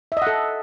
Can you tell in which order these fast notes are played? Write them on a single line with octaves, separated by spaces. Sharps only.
E5 D#5 F#5 A4